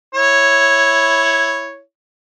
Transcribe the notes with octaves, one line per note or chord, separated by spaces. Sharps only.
E4 C#5